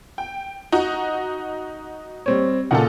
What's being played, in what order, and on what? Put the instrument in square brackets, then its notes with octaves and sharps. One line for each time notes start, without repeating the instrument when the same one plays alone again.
[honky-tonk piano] G5
D#4 F#4
[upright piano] G3 C4 C#5
[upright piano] A#2 C#3 F#5 [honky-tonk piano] D#4 F4 A4